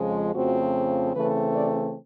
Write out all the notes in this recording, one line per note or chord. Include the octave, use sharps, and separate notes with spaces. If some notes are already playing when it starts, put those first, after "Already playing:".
Already playing: F2 C#3 F3 G#3
F2 C#3 F3 A3 C4 F#4
C#3 E3 A3 C4 B4
D5